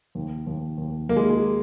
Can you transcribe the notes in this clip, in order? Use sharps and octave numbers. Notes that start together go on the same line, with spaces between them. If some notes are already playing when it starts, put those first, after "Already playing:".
D#2
D#2
D#2
D#2 A#3
G#3
G#3